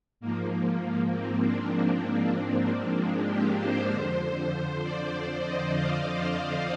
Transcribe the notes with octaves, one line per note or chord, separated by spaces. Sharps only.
G#2 F3 A#3
C4
D4
C4
A#3
A#3
G#3
G4
C5
F2 D3 F3
D5
D5
D#5
F5
F5